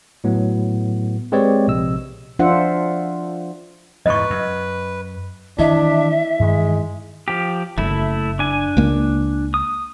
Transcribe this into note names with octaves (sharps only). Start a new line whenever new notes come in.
A2 F#3 B3
G#3 C4 G4 B4 C#5 D5
A#1 C3 D#5 E6
F3 D4 F4 C5 E5 F#5
E2 G#2 B4 D#5 C#6
F#2
D#3 E3 A#3 D4 E4 D#5 E5
G2 D#3 E3 G#3
F3 G4
F#1 A3 E4
D4 G#5
C#2 A#3
D#6